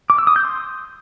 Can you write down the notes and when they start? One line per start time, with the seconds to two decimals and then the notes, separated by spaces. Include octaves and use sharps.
0.10 D6
0.18 E6
0.27 D#6
0.36 G6
0.45 C6